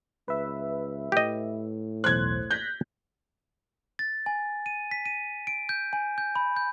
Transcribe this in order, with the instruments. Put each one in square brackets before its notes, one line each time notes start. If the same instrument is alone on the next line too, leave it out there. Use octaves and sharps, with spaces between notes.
[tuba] C#2 [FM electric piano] B4 E5
[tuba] A2 [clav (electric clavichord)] G4 D#5
[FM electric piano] B1 E2 C5 [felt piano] F#6 G#6
[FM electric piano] F#6 A#6 B6 [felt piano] G6
[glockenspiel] A6
G#5
D#7
B6
D#7
D7
G6
G#5
G6
B5
G6